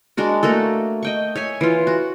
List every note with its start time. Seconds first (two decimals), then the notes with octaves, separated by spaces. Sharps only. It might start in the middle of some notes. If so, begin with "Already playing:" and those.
0.17 G#3 D4 F#4 A#4
0.43 A3 A#3 F#4 A4
1.03 D#5 G5 C#6
1.35 C#5 E5 G#5
1.61 E3 F4
1.87 F#4